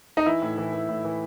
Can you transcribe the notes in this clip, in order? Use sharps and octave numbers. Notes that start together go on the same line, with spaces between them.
D#4
E3 E4
A2
E3
E3
A2
E3